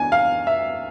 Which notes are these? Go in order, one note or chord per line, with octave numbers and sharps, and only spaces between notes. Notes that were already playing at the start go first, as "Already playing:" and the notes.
Already playing: E3 B3 D4 G#5
F5
E5